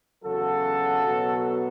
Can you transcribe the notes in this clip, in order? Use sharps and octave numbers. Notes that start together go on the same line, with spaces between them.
E2 C#3 F#3 F#4 A4
B2 F#3 B3